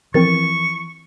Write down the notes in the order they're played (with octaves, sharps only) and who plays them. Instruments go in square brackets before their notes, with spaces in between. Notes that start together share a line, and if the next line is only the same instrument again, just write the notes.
[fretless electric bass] E3 [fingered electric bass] F3 [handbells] C4 A#4 A6 [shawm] C#6